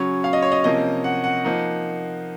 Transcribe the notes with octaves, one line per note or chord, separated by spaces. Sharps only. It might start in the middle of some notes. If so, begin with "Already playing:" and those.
Already playing: C#3 F#3 C#4 C#5
F5
D#5
C#5
D#5
C3 F3 A#3 C#4 D#5
F#5
F#5
F3 A#3 D#4